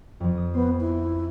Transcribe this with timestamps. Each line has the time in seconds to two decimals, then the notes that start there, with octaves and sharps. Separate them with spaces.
0.20 F2 F3
0.37 D#6
0.54 B3 C5
0.80 E4